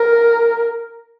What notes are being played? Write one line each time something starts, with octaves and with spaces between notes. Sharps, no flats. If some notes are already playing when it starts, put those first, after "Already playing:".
Already playing: A#4